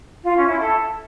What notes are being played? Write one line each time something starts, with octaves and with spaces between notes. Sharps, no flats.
F4
C#4
E4
A4